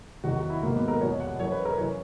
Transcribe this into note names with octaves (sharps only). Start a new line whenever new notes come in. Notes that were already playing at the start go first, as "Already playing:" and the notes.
E2 D#3 F#3 F#4
F#4
E4
G#2 D#3 F#3 A#3
B3
A#4
E2 B2 F#3 C#5
F#5
F#2 E3 C#5
B4
A#4
F#2 E3 C#5